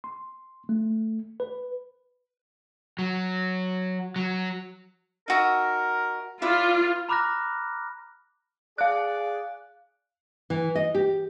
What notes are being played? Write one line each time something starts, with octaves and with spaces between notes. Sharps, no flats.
C6
A3
B4
F#3
F#3
D#4 F#4 A#4 E5
E4 F4 B4 D5 D6
A#5 B5 D6 F6 F#6 A#6
G#4 D5 F5 F#6
E3
D#5
G4